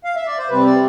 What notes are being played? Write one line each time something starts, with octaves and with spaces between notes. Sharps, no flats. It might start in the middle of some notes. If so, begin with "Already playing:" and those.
F5
E5
D5
C5
C3 G3 C4 B4
D5